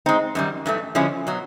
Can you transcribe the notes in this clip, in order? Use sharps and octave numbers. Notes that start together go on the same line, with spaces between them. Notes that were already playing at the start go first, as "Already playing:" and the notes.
G#3 C4 D#4
F#2 D#3 G3
G2 E3 A3
D3 F3 G#3 C#4 E4
B2 F#3